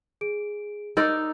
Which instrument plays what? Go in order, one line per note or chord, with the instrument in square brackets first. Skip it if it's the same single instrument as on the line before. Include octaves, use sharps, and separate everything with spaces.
[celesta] G#4 D7
[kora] D#4 A#4 D5 [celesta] E6